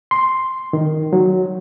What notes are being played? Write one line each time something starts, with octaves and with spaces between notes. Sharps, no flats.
C6
D#3
F#3